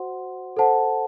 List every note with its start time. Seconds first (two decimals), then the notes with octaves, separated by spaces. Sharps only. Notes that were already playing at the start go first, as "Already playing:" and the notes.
Already playing: F#4 C5 F#5 C6
0.57 A4 C5 F#5 A5